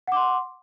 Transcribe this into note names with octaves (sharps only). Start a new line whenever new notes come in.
F#5 C6 D6